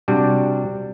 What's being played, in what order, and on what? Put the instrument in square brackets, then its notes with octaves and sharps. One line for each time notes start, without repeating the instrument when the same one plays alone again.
[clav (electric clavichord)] C3 G3 D4 F#4